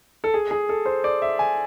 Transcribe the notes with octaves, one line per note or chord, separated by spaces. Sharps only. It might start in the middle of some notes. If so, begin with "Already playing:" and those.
A4
G#4
G#4
A4
C5
D5
E5
G#5